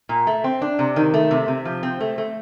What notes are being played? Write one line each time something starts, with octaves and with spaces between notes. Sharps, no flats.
A#2
A3
C4
D4
C3
D#3
A3
C3
C3
F3
C4
A3
A3